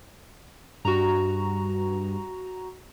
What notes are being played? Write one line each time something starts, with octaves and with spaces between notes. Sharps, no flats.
G2 F#4 A#5